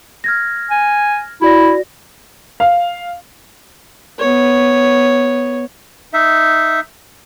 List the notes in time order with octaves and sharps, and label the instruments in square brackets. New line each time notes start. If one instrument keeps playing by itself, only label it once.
[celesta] F6 G#6 A#6
[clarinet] G#5
[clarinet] E4 [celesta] F#4 D5 A#6
[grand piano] F5
[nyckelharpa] B3 C#5
[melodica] D#4 E5